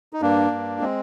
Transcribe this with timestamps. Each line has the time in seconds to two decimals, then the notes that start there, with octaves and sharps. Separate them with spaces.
0.13 D#4
0.21 G2 A#3 D4
0.51 G2
0.81 G#3 C4